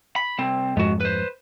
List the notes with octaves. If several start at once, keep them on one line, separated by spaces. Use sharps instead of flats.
B5
C2 C4
F2 G#2 G#3 F#4
B4 C5